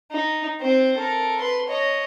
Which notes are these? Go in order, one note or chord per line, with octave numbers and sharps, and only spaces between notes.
D#4
C4 C5
A4 A#4
B4 C6
C#5 D#5